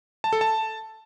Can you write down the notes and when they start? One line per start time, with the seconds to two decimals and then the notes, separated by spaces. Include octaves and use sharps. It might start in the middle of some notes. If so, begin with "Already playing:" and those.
0.24 A5
0.33 A4
0.41 A5